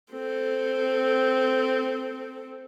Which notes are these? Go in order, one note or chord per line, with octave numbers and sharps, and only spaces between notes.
C4 A4